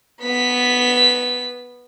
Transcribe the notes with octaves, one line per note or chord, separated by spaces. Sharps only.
B3 B6